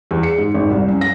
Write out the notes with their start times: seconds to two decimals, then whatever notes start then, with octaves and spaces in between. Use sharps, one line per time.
0.11 E2
0.23 C#7
0.38 G#2
0.54 G#1
0.70 C2
0.88 F#2
1.01 A#6